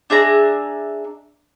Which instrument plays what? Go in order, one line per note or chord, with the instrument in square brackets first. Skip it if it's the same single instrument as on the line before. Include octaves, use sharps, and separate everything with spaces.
[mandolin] D4 G#4 E5 A#5